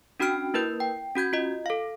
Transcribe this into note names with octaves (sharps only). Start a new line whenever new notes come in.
C#4 D4 F#4 G5 F6 D7
A#3 E4 A#4 B4 G6
G5
C#4 F#4 G6 G#6
F4 D#5
A4 F5